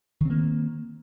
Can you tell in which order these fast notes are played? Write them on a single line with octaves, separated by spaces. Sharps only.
D#3 C4 A#3